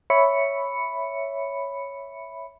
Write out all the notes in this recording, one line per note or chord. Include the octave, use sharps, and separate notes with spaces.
C#5 E5 B5 C#7